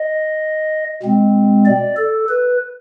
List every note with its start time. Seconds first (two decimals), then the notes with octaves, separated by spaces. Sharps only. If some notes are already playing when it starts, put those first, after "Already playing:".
Already playing: D#5
1.03 B2 G#3 C4
1.66 D5
1.97 A4
2.29 B4